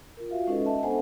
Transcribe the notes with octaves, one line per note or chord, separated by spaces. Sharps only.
F4 A#4
F4 F#4 E5 F5
G#3 C#4 D#4 A4 B4 D#5
D#5 E5 A5
B3 D4 A4 C5 F#5 G#5